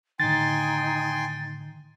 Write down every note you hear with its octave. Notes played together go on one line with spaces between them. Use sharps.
A2 D3 D#3 D#4 G5 G#5 C6 A6